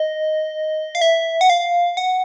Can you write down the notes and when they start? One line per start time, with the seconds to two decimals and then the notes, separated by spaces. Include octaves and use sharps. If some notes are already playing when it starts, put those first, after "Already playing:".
Already playing: D#5
0.95 F5
1.01 E5
1.41 F#5
1.50 F5
1.97 F#5